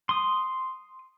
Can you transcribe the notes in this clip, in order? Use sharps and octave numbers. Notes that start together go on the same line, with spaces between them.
C6 D#6